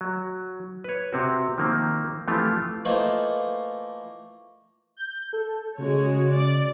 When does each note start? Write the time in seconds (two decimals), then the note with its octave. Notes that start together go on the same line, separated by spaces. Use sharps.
0.01 F#3
0.84 B4 C#5
1.13 C3 C4 F#4
1.58 D#3 F3 A#3 C4
2.28 E3 F3 A3 C4 F4 G4
2.85 E3 A3 A#3 D#4 F4 C5
4.97 G6
5.33 A4
5.78 C#3 G#3 F#4 C#5
6.31 D5